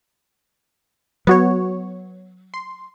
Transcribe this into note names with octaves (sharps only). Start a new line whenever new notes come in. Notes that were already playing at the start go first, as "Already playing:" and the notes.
F#3 B3 F#4 C#5
C6